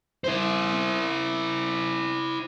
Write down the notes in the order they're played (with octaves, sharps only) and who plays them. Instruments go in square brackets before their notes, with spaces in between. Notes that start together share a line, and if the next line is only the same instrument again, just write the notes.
[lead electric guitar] E4 C5